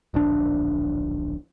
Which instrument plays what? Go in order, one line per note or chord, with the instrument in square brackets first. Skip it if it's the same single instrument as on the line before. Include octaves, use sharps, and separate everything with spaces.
[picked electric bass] D1 A#1 D4